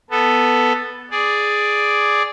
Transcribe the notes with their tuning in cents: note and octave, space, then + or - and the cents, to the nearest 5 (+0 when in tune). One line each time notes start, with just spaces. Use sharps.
B3 +0 A4 +0
G#4 +0 D5 +0